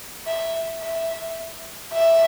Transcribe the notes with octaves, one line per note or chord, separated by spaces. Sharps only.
E5
E5
E5